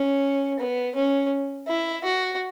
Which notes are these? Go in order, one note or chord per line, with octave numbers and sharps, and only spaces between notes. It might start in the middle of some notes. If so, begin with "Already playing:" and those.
Already playing: C#4
B3
C#4
E4
F#4